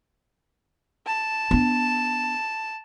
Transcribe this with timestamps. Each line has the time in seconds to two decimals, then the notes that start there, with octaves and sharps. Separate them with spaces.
1.07 A5
1.51 B3 D4